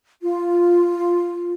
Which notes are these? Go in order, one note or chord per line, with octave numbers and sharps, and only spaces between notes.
F4